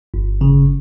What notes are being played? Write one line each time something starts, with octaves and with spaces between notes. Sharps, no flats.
G1
C#3